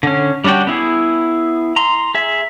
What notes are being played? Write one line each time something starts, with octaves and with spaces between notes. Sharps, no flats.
D3 C#4
G3 C#4 D4 F#4 G5
B3 E4 G#4
A#5 C6
G#4 E5